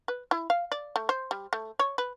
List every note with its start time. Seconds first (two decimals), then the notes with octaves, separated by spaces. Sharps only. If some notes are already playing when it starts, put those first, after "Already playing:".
0.08 B4
0.31 E4
0.50 F5
0.72 D5
0.96 A3
1.09 C5
1.31 G3
1.53 A3
1.79 C#5
1.98 B4